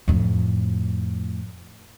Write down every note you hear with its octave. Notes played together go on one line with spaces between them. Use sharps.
F2 A2